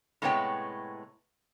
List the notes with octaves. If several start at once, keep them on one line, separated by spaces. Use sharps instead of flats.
A2 C3 G#3 B3 C#5 G5